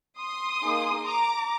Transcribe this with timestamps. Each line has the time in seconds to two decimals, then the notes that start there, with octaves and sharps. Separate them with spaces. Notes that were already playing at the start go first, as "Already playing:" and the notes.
0.19 C6 D#6
0.63 A#3 D#4 G#4
1.06 A#5 D6